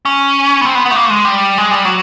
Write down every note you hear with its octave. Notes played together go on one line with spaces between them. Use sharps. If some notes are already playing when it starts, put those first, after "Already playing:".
C#4
B3
C4
B3
B3
A3
A#3
A3
G#3
G3
G#3
G3
F#3